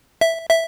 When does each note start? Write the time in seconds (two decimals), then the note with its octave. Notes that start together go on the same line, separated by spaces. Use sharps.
0.21 E5
0.50 E5